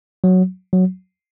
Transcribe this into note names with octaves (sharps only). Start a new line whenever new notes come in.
F#3
F#3